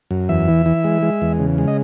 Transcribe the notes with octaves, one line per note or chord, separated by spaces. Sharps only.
F#2
E2 E5
E3
E3
G#3
G#3
E2
C#3
G#3
D#5